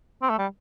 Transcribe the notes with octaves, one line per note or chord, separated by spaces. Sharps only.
C4
A3
G3